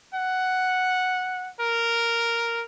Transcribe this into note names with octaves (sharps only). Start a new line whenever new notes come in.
F#5
A#4